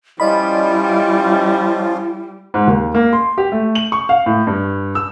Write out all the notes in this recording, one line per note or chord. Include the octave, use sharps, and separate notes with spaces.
F3 G3 C#4 E4 F4 D5 D#5 B5
G#2
D#2
A#3
C6
G4
A3
F#7
C#6
F5
A2
G2
E6